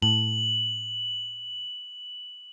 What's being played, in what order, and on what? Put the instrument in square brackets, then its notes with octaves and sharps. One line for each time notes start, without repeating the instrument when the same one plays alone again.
[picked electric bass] A2 [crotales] F#7